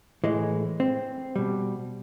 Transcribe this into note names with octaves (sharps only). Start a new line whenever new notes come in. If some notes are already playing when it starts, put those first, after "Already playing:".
A2 E3 G#3
C4
B2 G3